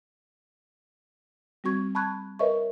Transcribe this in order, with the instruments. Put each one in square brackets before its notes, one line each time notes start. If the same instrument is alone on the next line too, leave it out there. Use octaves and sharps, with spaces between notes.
[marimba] G3 C4 F#4 C#6 G#6
A5 B5 C#6 F#6 G#6
A#4 B4 C#5 D#5 E5 C#6